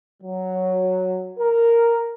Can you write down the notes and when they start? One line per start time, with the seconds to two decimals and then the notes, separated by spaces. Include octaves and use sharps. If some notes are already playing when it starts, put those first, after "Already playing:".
0.22 F#3
1.37 A#4